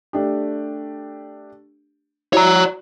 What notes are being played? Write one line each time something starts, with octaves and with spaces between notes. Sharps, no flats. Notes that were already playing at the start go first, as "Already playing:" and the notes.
A3 D4 G4
E4 F#4 C#5 D5 A#5